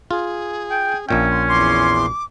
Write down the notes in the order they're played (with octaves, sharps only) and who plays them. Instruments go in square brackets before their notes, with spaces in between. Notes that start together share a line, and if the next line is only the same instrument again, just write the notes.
[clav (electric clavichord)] F4 [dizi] G#4
[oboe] G5
[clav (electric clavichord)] A#1 A#2 G5 [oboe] C#4 [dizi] E5
[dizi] C6
[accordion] E2 C6 [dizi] D6